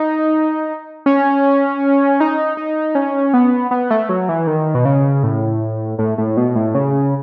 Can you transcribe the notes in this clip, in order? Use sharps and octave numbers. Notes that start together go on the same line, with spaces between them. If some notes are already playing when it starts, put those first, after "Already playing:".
Already playing: D#4
C#4
D#4
D#4
C#4
B3
B3
A3
F#3
E3
D#3
B2
C#3
A2
A2
A2
B2
A2
C#3